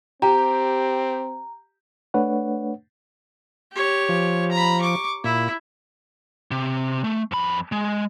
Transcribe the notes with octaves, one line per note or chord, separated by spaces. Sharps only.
C4 G4 A#5
A3 D4 B4 C#5 F#5
G4 C#5
F3
A#5 B5
C#6 D6
A#2 E4
C3
A3
F2 B5
G#3